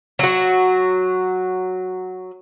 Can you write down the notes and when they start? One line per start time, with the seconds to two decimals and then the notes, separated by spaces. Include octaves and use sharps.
0.19 F#3 F#4